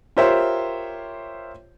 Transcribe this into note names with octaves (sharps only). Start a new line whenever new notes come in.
F4 G4 A#4 C5 C#5 E5